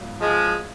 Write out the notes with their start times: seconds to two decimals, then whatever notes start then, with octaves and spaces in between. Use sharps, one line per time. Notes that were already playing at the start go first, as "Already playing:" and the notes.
Already playing: G#1 G#2 F#3 B3 F4
0.21 F3 G#3